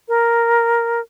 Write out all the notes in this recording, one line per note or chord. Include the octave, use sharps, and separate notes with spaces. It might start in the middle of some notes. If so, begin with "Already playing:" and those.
A#4